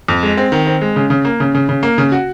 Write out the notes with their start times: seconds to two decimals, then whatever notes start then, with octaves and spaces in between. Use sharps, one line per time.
0.08 F2
0.23 G#3
0.37 C4
0.52 D#3
0.67 C4
0.81 G#3
0.96 C#3
1.10 C#3
1.25 A#3
1.40 C#3
1.55 C#3
1.69 C#3
1.83 A#3
1.98 C#3
2.12 F#4